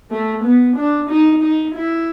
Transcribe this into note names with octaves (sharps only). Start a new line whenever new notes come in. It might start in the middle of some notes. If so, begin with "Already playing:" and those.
A3
B3
D4
D#4
D#4
E4